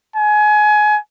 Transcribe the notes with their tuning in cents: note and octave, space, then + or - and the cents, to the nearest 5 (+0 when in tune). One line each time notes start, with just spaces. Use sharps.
G#5 +25